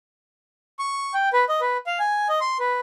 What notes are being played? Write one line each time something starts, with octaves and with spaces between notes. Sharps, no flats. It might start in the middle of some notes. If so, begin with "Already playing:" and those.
C#6
G5
B4
D#5
B4
F5
G#5
D#5
C6
B4